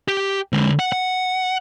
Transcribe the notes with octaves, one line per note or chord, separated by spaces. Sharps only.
G4
D3 G#3
F#5
F#5